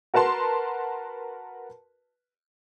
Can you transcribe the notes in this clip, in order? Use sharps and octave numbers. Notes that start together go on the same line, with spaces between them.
F#4 A#4 B4 A5 C6